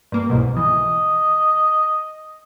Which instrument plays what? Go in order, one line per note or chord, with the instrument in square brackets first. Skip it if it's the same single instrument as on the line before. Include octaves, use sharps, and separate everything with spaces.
[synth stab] G2 A#3
C2 G#2 B2
[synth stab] E3 [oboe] D#5